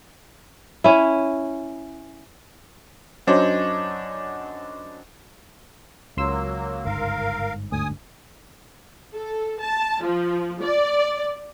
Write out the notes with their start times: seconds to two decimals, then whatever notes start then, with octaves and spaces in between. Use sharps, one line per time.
0.84 C#4 E4
3.27 F#2 F#3 D4 D#4 C5 C#5
6.17 C#2 F#3 A#3 C6 E6
6.85 G1 G#2 A#4 F5
7.72 D2 G#5 D#6
9.13 A4
9.60 A5
10.02 F3
10.62 D5